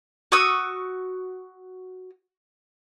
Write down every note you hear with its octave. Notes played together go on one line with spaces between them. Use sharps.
F#4 C#6 D#6 E6